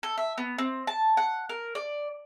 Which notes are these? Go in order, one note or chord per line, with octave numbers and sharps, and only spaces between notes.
A4
E5
B3
C4
A5
F#5
A#4
D5